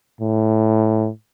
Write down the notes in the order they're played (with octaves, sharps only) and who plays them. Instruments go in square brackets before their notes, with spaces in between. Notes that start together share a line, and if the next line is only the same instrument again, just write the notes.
[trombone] A2